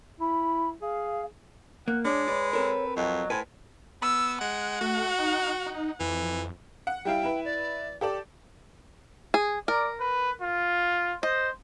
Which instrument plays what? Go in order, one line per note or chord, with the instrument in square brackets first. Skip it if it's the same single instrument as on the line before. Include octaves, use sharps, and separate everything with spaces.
[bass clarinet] E4 [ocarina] B5
[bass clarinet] G#4 [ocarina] F5
[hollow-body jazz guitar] A#3 [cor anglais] F#5
[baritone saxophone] G#3 [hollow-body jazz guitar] D4 [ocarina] C#5 [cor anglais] D5
[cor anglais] B4 [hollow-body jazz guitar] D5
[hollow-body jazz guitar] C4 A4 A#4 [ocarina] C#5
[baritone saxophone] F2 [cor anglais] F#3 [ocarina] D#5
[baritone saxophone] A2 [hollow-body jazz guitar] B4 C5 [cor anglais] G#5
[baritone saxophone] B3 [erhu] E6
[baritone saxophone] G#3 [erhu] F#5
[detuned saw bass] A3 [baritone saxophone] F#4
[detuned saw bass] D#4
D#4
[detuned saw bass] F2 [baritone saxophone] E3
[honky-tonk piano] F#5
[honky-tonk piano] G3 E4 F5 [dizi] G5
[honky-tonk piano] E4 B4
[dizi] D5
[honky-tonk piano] G4 A4 D5
[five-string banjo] G#4
[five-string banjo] A#4 [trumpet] D5
[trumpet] B4
F4
[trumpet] C5 [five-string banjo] D#5